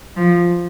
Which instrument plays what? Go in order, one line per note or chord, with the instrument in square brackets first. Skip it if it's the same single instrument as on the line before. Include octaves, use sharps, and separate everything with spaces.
[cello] F3